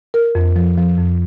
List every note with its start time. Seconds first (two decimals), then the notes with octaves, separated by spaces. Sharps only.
0.14 A#4
0.35 F2
0.56 F3
0.78 F3
0.98 F2